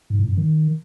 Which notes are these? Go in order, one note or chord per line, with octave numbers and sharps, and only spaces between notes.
G#2
A2
F#2
D#3